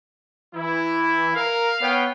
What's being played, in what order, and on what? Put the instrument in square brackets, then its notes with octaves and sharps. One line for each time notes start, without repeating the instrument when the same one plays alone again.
[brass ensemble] E3 E4
[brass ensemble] A#4 [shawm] F5
[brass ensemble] B3 C#5 G5